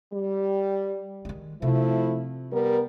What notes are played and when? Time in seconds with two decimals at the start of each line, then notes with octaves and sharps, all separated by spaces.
0.13 G3
1.25 D#3 G#3
1.62 C3 F3 A3 E4
2.51 G3 B3 A#4